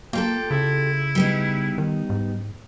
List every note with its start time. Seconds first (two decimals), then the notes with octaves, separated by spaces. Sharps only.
0.13 A#3 F4 G4 A4 G5
0.51 C#3 E4
1.15 G3 B3 D#4
1.78 D#3
2.10 G#2